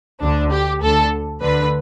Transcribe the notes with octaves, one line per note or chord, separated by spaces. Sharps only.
D2 D3 D4
G4
D2 D3 A4
D2 D3 B4